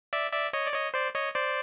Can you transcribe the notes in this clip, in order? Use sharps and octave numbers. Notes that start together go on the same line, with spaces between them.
D5 E5
D5 E5
C#5 D#5
D5
C#5 D#5
C5 D5
C#5 D#5
C5 D5